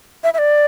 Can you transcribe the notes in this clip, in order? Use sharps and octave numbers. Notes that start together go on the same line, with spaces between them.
E5
E5
D5